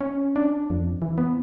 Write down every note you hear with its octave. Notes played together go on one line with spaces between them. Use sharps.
C#4
D4
F2
E3
B3